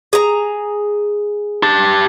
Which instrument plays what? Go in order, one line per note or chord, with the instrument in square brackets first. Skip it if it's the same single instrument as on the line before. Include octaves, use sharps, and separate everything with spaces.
[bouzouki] G#4 A#5
[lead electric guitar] G4 A5